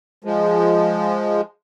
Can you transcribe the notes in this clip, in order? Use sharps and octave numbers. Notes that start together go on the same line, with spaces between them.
F3 G#3